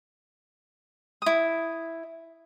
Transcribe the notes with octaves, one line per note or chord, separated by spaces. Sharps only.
E4 D#6